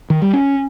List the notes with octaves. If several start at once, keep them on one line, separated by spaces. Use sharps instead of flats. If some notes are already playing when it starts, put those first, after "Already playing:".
D#3
G3
C#4